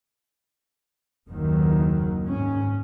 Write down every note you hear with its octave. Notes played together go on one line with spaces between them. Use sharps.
F#1 D#2 D#3 F#3
G#2 C#4